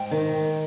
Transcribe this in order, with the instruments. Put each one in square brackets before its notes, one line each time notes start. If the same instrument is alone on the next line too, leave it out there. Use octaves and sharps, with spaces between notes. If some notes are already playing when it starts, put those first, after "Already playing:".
Already playing: [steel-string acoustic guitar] G#2 G5
D#3